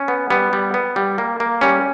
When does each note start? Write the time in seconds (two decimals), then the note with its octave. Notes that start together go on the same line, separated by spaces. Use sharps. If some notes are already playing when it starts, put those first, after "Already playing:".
Already playing: C#4
0.08 B3
0.30 G3 B3
0.53 G3
0.74 B3
0.96 G3
1.18 A#3
1.40 A#3
1.61 G3 C#4